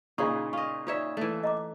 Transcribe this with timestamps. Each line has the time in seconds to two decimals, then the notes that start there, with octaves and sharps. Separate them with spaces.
0.18 A#2 C#3 D#4 G#4 C#6
0.53 F4 D#5 C#6
0.87 D#4 F4 C#5 D5 E5
1.17 E3 A3
1.44 D#5 A#5 D6